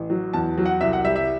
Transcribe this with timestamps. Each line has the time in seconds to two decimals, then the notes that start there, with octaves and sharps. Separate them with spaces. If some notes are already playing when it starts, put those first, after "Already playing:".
Already playing: A1
0.10 F#3
0.33 E2 A5
0.58 F#3
0.66 F#5
0.81 C2 E5
0.93 F#5
1.04 G3 E5
1.16 E5